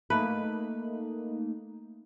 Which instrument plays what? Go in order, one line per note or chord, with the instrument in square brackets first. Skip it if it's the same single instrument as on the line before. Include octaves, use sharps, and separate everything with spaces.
[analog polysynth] A3 A#3 D#4 [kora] B4